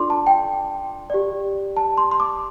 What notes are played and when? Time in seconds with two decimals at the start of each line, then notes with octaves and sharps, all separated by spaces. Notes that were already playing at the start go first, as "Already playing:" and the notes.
Already playing: D4 F4 A4 D5 C6 D6
0.10 A5
0.27 G5
1.10 G4 D5
1.77 A5
1.98 C6
2.11 C6
2.20 D6